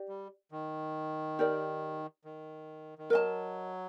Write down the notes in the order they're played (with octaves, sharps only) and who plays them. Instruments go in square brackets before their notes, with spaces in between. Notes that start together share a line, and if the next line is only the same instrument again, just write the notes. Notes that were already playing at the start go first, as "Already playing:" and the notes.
Already playing: [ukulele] G4 D5
[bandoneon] G3
D#3
[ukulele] D#4 G4 A#4 D5
[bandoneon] D#3
D#3
[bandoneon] F#3 [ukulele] A#4 D#5 A5